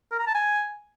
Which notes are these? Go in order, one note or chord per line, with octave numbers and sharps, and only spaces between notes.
A#4
A#5
A5
G#5